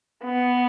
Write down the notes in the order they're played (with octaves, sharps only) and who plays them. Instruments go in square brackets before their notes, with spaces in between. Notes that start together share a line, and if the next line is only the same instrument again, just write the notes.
[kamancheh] B3